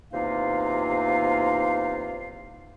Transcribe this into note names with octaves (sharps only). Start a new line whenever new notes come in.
E2 C3 A#3 D#4 F4 F5